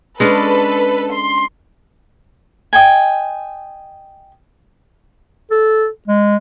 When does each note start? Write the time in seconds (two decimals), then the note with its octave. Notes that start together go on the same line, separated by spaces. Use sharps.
0.20 G#3 C#4 D4 A4 B4
1.12 C6
2.73 D#5 G5 G#5
5.51 A4
6.08 G#3